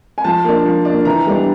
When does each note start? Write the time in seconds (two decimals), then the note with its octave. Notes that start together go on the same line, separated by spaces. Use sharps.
0.18 G#5
0.24 F3 A5
0.44 A#3 D4
0.65 F3
0.85 A#3 D4
1.05 E3 A#5
1.27 G3 B3 D4